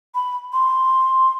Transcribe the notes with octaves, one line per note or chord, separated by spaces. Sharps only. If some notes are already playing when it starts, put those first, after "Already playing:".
B5
C6